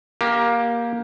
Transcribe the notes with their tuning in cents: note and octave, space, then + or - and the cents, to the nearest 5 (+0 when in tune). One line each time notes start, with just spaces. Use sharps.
A#3 +15 G4 +0 A#4 +0